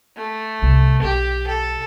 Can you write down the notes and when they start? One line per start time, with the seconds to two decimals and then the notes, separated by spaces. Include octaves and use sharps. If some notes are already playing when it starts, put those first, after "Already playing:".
0.16 A3
0.62 C2
1.02 B1 G4
1.47 A4